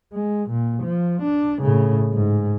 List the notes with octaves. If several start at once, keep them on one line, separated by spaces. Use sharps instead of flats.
G#3
A#2
F3
D4
A2 C#3
G#2